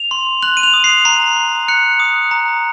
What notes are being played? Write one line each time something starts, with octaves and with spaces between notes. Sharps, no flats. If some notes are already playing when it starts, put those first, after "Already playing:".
Already playing: F7
C6
F#6 F#7
D#7
F7
D#6
C7
A#5 C7
A#5
F#6 C#7
D#6
A#5